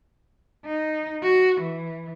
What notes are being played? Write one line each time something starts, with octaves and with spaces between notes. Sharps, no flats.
D#4
F#4
E3